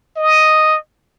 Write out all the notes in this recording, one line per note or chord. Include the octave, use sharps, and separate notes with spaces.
D#5